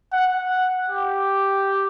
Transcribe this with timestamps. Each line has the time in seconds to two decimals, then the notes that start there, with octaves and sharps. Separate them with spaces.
0.13 F#5
0.90 G4